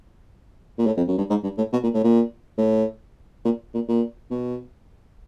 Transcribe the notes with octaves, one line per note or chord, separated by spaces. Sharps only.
A#2
A2
F2
F#2
G2
G#2
G2
A2
B2
A#2
A2
A#2
A2
A#2
A#2
A#2
B2